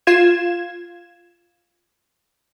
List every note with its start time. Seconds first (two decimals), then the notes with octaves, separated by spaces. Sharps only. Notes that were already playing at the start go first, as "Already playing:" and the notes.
0.07 F4 G#6 E7